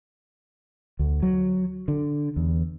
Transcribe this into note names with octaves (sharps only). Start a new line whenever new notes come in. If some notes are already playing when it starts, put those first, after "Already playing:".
D2
F#3
D3
E2